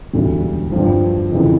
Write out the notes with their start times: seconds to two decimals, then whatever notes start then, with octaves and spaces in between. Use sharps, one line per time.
0.13 E1 D2 D3 G3
0.72 G2 D3 F3
1.31 F2 C#3 E3